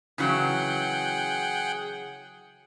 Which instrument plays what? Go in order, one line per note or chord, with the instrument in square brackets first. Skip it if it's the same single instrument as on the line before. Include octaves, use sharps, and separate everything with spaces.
[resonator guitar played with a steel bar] C#3 E3 F#3 [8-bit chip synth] G#4 F#5 G5